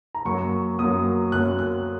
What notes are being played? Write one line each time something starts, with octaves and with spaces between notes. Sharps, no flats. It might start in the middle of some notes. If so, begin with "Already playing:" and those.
A#5
F#2 F#3 A#3 C#6
F#2 F#3 A#3 D#6
F#2 F#3 A#3 F#6
F#6